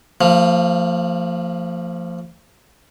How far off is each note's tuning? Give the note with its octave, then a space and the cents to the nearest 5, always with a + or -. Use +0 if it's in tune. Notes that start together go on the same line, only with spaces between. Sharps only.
F3 +0 A#3 -45